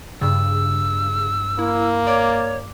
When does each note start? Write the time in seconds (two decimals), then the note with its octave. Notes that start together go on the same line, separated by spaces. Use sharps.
0.21 G2 C#3 E6
1.59 A#3 E4
2.07 C#5 D5 D6